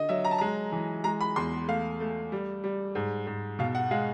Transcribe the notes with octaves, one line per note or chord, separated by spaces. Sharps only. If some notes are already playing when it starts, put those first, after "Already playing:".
Already playing: D3 D#5
F#3 E5
A#5
A5
G#3 A#5
E3
G#3 A#5
B5
E2 C6
A3 F5
A3
G3
G3
G#2
G#2
B2 F5
F#5
G#3 F5